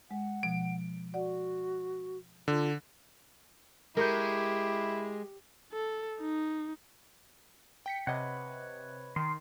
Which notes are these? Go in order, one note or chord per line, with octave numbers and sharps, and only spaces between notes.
G#3 F#5
B2 F3 D7
F#4 D5 F#5
D3 F4
G#3 E4 G4 A#4 C#6 G6
A4
D#4
G5 B6 C#7
C3 B4 C#5 D#5 F#5
D#3 C6